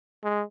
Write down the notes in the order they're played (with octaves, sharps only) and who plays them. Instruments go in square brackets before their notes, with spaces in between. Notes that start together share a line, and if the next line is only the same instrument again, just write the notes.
[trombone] G#3